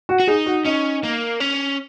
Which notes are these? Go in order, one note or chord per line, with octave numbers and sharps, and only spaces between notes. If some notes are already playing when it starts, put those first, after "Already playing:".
F#4
F#4
D#4 G#4
F#4
C#4 D#4
A#3
C#4